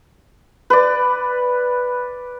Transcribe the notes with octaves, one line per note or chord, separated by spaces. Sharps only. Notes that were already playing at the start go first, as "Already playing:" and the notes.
B4 D5